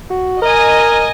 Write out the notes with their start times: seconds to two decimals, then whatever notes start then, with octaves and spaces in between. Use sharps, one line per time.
0.10 F#4
0.42 A#4 D#5 G#5